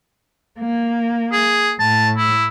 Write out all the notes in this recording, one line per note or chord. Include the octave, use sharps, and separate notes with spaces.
A#3
G#4
A2 A5
E4